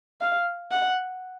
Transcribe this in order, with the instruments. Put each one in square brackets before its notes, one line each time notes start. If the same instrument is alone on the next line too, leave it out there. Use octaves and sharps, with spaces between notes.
[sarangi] F5
F#5